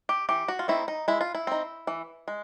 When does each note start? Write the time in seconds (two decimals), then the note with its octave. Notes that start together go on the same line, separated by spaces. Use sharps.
0.09 G4
0.29 E3 G4
0.48 F#4
0.59 F4
0.68 A3 C4 D#4 E4
0.88 D#4
1.08 G#3 E4
1.21 F4
1.35 E4
1.47 C4 D#4
1.87 E3
2.28 G#3